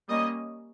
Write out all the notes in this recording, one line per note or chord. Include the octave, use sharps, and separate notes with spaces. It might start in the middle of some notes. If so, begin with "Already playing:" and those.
G3 A#3 C#4 D#5